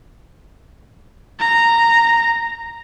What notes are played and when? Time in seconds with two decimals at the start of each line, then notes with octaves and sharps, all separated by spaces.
1.40 A#5